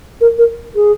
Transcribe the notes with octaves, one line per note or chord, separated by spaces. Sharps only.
A#4
A#4
G#4